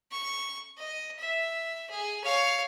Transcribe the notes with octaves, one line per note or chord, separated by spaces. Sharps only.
C#6
D#5
E5
G#4
C#5 F5